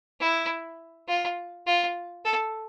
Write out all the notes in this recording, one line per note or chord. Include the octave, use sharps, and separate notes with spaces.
E4
F4
F4
A4